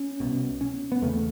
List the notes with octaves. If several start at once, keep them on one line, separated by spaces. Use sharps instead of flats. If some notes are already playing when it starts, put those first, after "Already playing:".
Already playing: C#4
C2 B2
C#4
B3
E2 C#3 A3